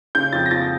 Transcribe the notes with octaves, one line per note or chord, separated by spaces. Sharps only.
C#3 G6
F2 A6
A#6
F3 A6